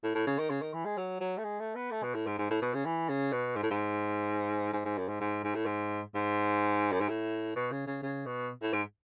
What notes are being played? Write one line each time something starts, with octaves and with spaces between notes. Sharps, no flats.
A2
A2
C#3
D#3
C#3
D#3
E3
G#3
F#3
F#3
A3
G#3
A3
B3
A3
B2
A2
G#2
G#2
A2
B2
C#3
E3
C#3
B2
G#2
A2
G#2
G#2
G#2
F#2
G#2
G#2
G#2
A2
G#2
G#2
F#2
G#2
A2
B2
C#3
C#3
C#3
B2
A2
G#2